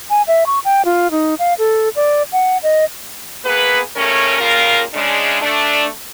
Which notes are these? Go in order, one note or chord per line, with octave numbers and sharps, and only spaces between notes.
G#5
E5
C#6
G5
F4
D#4
F5
A4
D5
F#5
D#5
A#3 B3 G#4 B4
C#3 G3 A3 C#4 A#4 C#5
C#3 G3 A#3 F4 A#4
C#3 G#3 D4
A3 D4